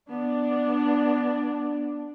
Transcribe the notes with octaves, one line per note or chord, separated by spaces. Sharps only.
B3 D4